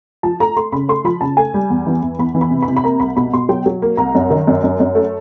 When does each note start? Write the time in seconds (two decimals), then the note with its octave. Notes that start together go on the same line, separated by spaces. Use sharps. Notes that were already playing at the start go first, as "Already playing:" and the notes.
0.23 F3 A5
0.40 A3 A#5
0.57 A3 C6
0.72 C#3 B5
0.89 A3 C6
1.05 F3 B5
1.21 C#3 A5
1.37 A3 G#5
1.54 G3
1.70 E2
1.87 E3
2.02 E2
2.19 E2 B5
2.35 E3
2.41 B5
2.51 C3
2.62 B5
2.68 C3
2.77 B5
2.84 A#3 A#5
3.00 C2 B5
3.17 B2 B5
3.33 B2 C6
3.49 F#3 G5
3.66 F#3
3.82 A#3
3.97 C2 A#5
4.15 F#2
4.30 D#3
4.47 F#2
4.64 F#2
4.80 F#2
4.95 A3